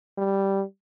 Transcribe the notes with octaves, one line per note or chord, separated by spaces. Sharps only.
G3